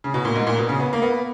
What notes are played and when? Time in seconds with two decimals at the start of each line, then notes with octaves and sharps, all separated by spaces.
0.04 C#3
0.14 B2
0.25 A#2
0.36 G#2
0.47 A#2
0.58 B2
0.69 C#3
0.80 B3
0.93 A#3
1.02 B3